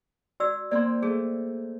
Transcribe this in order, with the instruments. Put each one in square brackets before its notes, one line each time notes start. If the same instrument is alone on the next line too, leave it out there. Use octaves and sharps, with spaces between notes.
[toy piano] F#4 D5 E6
[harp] A#3 C4 [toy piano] D5 C6
[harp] A3 [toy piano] G#4